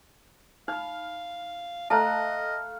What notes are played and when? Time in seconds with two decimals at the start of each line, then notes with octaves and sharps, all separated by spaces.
0.68 D#4 F5 B5 F6
1.90 A3 A4 D#5 F5 A5 A#5 F#6